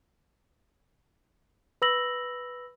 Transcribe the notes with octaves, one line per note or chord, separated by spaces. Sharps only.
B4 B5 E6 A#6 F#7